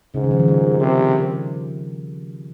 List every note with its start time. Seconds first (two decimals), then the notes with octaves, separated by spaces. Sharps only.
0.14 G#2 C#3
0.24 D#3
0.31 F3
0.39 D#3
0.48 G3
0.80 C3